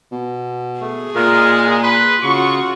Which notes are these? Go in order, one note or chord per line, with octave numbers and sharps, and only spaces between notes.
B2
A3 G#4
A#2 G#3 F4 A#4
B4 C6
C#3 F4 F#4 C6 C#6